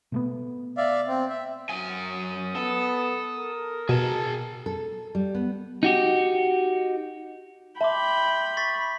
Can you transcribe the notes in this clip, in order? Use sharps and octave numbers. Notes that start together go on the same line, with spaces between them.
B2 A3 B3
D5 E5 F5
C4
E5
F#2 G#5 D#6
B3 A4
A#4
B2 G#4 A5
A4
G3
B3
D#4 F#4 G4
E5 G5 A5 B5 C6 D6
C#6 A6 B6